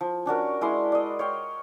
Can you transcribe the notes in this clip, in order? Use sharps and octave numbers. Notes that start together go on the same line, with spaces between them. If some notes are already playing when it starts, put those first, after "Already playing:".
F3
C#4 D4 F#4 A#4
G#3 E4 D5 C6
D5 D#5
C#5 F5 G5